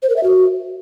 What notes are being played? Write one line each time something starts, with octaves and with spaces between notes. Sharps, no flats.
C5
A#4
E5
F#4